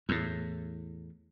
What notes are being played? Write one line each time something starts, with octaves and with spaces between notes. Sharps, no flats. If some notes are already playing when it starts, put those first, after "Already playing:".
E2 A2